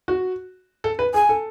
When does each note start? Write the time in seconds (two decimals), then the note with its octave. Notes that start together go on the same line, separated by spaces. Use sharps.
0.08 F#4
0.84 A4
0.99 B4
1.14 G#4 G#5
1.29 A4